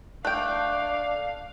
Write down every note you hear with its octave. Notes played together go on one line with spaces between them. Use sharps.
A3 D4 F5 G5 F#6